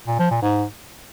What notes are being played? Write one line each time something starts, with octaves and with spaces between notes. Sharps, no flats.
A#2
F3
A#2
G#2